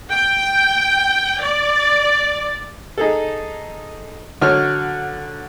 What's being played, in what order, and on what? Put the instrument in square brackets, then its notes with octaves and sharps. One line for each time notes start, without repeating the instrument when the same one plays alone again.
[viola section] G5
D5
[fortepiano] D#4 G#4 A4
D3 F#3 C#5 F6